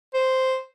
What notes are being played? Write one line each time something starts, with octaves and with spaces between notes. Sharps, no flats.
C5